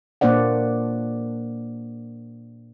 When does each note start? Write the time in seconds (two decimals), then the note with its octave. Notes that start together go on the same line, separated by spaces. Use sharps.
0.21 A#2 A#3 D4 C5 D5 F#5